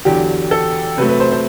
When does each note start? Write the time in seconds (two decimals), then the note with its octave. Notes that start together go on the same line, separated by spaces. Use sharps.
0.05 E2 D3 F#3 G4
0.51 A4
0.97 C3 F#3 A3 B4
1.09 B4
1.20 C5
1.32 C5